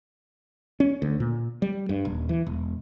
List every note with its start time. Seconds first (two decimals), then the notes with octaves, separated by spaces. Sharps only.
0.80 C#4
1.02 D2
1.20 A#2
1.62 G3
1.89 G2
2.05 D#1
2.29 E3
2.47 E1